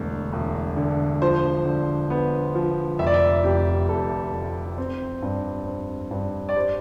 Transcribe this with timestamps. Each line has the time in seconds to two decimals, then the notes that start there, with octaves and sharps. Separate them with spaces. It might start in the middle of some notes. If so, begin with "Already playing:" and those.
Already playing: E1 D2
0.33 E1
0.77 D3
1.22 F3 C5
1.66 D3
2.10 B3
2.55 F3
2.99 F1 E5
3.07 D5
3.14 E5
3.44 F2 G4
3.88 F1 A4
4.33 F1
4.78 C4
5.22 G2
5.67 C4
6.11 G2
6.49 D5
6.56 G3 C5